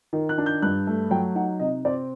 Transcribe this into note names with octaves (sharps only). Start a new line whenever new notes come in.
D#3
F#6
D4
G6
G2 F#6
A3
F#3 G5
D#4 F#5
C3 D#5
C4 D5